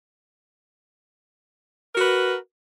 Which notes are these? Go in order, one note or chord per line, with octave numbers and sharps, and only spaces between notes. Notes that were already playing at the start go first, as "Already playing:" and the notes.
F#4 A#4 B4